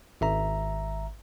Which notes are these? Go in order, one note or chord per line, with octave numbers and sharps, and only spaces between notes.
G#1 E5 A#5